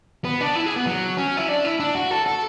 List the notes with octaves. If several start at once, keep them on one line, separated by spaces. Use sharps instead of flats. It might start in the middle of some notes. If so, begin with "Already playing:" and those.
B3
D4
E4
G#4
B3
F#3
C#4
E4
D4
E4
D4
F#4
A4
A4